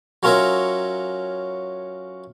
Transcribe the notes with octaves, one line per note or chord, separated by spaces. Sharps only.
F#3 C#4 F4 A#4 C#5 E5